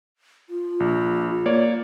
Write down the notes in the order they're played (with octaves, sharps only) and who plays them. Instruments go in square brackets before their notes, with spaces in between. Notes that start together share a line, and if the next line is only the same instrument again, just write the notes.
[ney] F4
[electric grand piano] A#1
A#3 C#5 D5